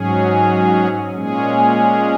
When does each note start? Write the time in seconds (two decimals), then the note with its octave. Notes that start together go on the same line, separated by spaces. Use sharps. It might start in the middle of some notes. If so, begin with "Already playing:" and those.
Already playing: G#2 F#3 C#4 G#4
1.14 A#2 G#3 C#4 G#4